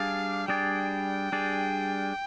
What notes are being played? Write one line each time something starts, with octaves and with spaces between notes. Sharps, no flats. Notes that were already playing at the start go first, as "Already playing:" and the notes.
Already playing: G3 D4 G#4 D5 F5
G3 D4 G#4 D5 G5
G3 D4 G#4 D5